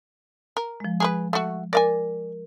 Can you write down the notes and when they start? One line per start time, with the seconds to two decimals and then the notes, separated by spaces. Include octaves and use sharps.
0.57 A#4
0.80 F3 G#3
1.00 G#4 A#4 B4
1.33 A3 F#4
1.73 A#4 D5 F5 G#5